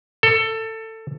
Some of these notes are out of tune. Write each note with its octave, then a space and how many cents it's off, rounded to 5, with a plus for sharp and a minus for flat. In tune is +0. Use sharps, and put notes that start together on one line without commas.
A4 +20